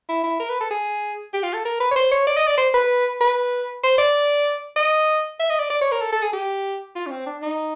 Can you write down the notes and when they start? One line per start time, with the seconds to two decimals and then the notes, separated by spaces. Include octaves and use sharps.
0.09 E4
0.24 E4
0.39 A#4
0.49 B4
0.60 A4
0.71 G#4
1.33 G4
1.43 F4
1.53 A4
1.65 A#4
1.80 B4
1.91 C#5
1.96 C5
2.11 C#5
2.27 D5
2.37 D#5
2.47 D5
2.58 C5
2.74 B4
3.21 B4
3.83 C5
3.98 D5
4.76 D#5
5.39 E5
5.50 D#5
5.59 D5
5.70 D5
5.81 C#5
5.92 A#4
6.02 A4
6.12 A4
6.22 G#4
6.33 G4
6.96 F4
7.06 C#4
7.11 C4
7.26 D4
7.42 D#4